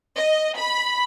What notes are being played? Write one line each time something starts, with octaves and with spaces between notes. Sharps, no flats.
D#5
B5